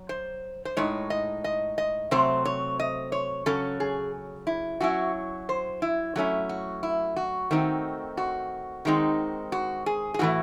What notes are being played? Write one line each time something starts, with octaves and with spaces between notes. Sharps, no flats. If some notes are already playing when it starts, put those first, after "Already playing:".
Already playing: F#3
C5
C5
A2 G#3 D#4 C#5
D#5
D#5
D#5
C3 F#3 A3 C4 C5
C#5
D#5
C#5
C#3 F#3 C#4 A4
G#4
E4
F#3 C#4 E4 F#4
C5
E4
F#3 A3 C#4 E4 F#4
F#4
E4
F#4
D#3 A3 C4 D#4
F#4
D#3 G#3 C4 D#4
F#4
G#4
G#4
A2 E3 A3 F#4